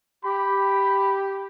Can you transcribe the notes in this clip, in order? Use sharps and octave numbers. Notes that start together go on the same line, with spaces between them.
G4 B5